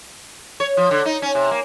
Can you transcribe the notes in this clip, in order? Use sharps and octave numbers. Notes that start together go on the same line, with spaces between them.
C#5
F3
D3
D#4
C#4
C3
A#3